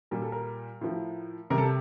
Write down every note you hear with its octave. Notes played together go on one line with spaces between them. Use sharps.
A#2 G3 A#4
A4
A#4
A2 F3
C3 G3 A#4
A4
G4